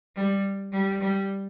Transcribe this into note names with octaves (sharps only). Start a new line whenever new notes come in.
G3
G3
G3